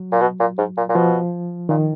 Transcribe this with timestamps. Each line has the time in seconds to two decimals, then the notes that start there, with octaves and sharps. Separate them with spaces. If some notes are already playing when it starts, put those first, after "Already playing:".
Already playing: F#3
0.12 A#2
0.21 B2
0.40 A#2
0.58 G#2
0.77 A#2
0.89 A#2
0.95 B2 F3
1.69 A#2 D#3